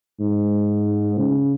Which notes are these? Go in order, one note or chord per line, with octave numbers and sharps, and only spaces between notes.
G#2
C#3